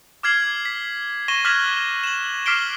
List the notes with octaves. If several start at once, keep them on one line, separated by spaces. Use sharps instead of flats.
D6 F6 G#6 C7 F#7
B6
C#6 A#6 D#7 E7 G7
D6 F6 F#6 G#6 B6 F#7
E7 F#7
D6 F6 B6 C7 D7 G7